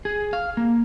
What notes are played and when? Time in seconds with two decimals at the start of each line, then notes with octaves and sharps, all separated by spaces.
0.05 G#4
0.33 F5
0.57 A#3